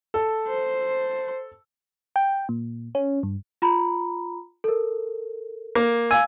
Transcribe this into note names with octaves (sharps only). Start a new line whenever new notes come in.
A4
C5
G5
A#2
C#4
G2
F4 A#5 B5
A4 A#4
A#3
F5 G#5 E6